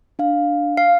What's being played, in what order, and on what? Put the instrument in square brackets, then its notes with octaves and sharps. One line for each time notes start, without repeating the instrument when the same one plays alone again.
[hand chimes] D4 F5
[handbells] F5